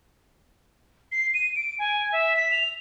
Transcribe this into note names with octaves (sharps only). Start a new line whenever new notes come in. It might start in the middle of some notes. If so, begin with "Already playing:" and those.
C7
D#7
D7
G#5
E5
B6
F7